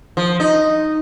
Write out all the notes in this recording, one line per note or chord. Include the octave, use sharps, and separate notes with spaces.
F3
D#4